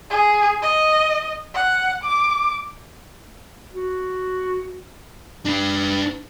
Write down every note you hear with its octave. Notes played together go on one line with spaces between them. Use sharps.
G#4
D#5
F#5
D6
F#4
D4 B4